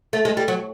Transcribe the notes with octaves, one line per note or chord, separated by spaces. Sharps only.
A3
G#3
G3
F#3